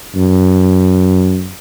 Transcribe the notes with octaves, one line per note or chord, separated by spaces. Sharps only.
F#2